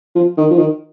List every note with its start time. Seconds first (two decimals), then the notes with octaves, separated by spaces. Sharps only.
0.15 F3
0.38 D#3
0.51 F3
0.59 D#3